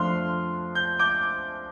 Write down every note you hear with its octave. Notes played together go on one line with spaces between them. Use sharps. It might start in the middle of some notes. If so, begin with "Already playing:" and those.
Already playing: F2 F3 A3 D4 F4 C6 F6
G6
D6 G6